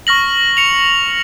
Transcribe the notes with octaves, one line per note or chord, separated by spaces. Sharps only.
C#6 F6 A#6 F#7
C#7 F7